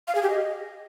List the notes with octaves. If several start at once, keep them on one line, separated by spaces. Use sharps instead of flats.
F5
G#4
G4
D#5